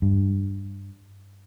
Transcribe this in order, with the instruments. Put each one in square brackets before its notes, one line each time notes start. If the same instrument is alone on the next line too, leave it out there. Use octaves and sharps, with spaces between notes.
[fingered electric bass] G2